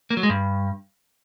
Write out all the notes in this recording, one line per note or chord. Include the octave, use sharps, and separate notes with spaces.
A#3
F#3
G#3
G2